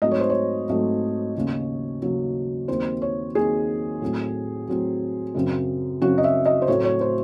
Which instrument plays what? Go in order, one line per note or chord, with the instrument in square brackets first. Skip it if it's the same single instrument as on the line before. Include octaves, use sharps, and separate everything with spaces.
[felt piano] G#2 F#3 A3 C4 D#5
C#5
C5
C#5
G#2 F#3 A3 C4
D#2 C#3 F#3
D#2 C#3 F#3
D#2 D#3 F#3 C4 C5
C#5
D#2 D#3 F#3 C4 G#4
A2 F#3 C4
A2 F#3 C4
F#2 C#3 F#3 C4
F#2 C#3 F#3 C4 F#4
D#5
E5
D#5
C5
A2 F#3 A3 C4 C#5
C#5
C5